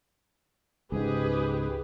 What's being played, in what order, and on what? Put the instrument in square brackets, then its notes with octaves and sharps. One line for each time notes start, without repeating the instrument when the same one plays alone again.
[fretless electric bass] C#2 G#2 [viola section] G4 G#4 B4